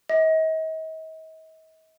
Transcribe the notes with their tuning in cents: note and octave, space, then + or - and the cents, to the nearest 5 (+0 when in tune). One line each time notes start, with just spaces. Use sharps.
D#5 +45